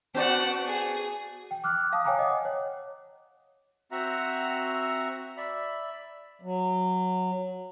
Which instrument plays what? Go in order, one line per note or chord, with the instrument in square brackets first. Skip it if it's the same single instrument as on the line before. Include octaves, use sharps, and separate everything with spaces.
[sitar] B3 F#4 D5 [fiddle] F#5 A5
[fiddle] G#4
[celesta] G5
D6 F6 F#6
F5 A5 D#6
C#5 F5 G5 G#5 A#5 D6
D#5 F#5
C#5
[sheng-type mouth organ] C4 F#4 E5 F#5 A#5
D5 E5 B5
[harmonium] F#3